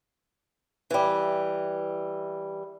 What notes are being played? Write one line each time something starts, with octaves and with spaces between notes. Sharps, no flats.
E3 G3